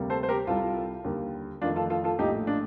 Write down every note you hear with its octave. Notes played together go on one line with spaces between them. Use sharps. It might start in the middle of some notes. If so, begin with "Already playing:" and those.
Already playing: D2 C3 G3 A#3
A4 C5
C5
G4 A#4
C2 C3 G3 F4 A4
D#2 D3 G3 A#3
F2 D#3 A3 D4 F4
F4 A4
F4 A4
F4 A4
A#1 A2 A3 D#4 G4
D4 F4